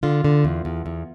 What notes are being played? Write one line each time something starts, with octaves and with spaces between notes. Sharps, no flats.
D3 F4
D3
E2
E2
E2